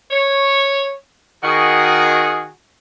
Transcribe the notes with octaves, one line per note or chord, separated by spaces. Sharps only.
C#5
D#3 F#4 G#4